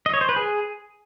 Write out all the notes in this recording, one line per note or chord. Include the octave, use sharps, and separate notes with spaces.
D#5
C#5
C5
B4
G#4